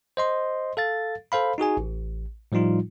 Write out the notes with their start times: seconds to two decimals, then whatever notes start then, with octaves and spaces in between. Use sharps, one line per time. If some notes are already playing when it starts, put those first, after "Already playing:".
0.17 C5 D#5 C6
0.77 A4 F5 A6
1.32 A4 C5 F5 B5
1.58 D#4 F#4 G#4 G#5
1.77 A1
2.52 A2 F3 G3 D#4 F4